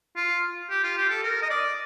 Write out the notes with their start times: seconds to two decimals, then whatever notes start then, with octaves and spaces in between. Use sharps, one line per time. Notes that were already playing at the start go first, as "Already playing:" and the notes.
0.16 F4
0.70 G4
0.83 F4
0.97 G4
1.10 A4
1.23 A#4
1.42 D#5
1.50 D5